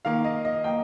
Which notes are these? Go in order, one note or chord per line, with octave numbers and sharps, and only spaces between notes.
D#3 A#3 F5
D#5
D#5
A#3 G5